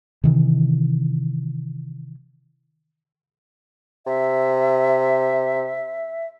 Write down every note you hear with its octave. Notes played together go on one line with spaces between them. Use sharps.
C3 D#3 E3
C3 E5